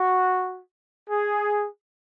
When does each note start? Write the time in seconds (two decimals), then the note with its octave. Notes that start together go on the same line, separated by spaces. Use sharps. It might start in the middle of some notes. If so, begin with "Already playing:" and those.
Already playing: F#4
1.09 G#4